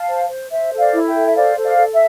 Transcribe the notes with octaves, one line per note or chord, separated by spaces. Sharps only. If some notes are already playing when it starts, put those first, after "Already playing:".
Already playing: F5 A5
C5
C5
C5 E5
A4
D5 F5
E4
E5 G5
A4
E5
C5 D5 F5
A4
D5 F5
A4
E5